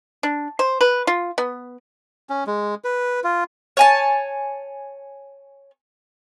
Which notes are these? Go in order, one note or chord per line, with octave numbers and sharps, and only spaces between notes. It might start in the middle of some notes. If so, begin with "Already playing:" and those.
D4
C5
B4
F4
B3
C#4
G#3
B4
F4
C#5 G#5 A5